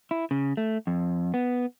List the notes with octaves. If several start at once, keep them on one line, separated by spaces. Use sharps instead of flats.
E4
C#3
A3
F2
B3